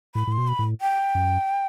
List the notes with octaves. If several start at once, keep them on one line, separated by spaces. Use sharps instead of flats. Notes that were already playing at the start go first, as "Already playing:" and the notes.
A2 B5
A2 C6
B2
B5
A2
G5
F#2